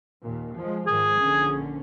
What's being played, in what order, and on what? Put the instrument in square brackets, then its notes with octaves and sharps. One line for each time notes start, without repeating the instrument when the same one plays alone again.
[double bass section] D#2 A#2
F3 G#3
[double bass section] G#2 D#3 F3 [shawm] G#4
[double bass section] A#1 D3 C#4